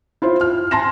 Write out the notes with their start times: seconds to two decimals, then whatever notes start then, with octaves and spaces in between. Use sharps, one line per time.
0.22 E4 F4 C5
0.41 F6
0.71 G#5 A5 C6 A#6 E7